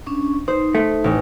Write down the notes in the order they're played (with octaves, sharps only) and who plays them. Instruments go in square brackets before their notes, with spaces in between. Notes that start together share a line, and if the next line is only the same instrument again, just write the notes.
[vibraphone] C#4 D4 C#6
[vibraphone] D#4 [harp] C5
[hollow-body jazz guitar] A3
[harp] A1